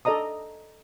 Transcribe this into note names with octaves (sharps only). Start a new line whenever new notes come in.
A4 D5 D#5 A#5 D#6